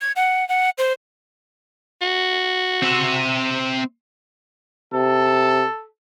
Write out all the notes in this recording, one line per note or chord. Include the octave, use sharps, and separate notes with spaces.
G#6
F#5
F#5
C5
F#4
C4 E5
C3 A4